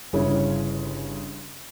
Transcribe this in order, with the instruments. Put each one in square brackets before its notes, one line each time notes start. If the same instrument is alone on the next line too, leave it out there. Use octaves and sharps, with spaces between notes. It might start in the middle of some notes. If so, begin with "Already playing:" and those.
[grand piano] G1 C#3 E4 C#5